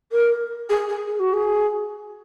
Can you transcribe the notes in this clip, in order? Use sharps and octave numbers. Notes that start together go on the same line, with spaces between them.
A#4
G#4
G#4
G#4
F#4
G#4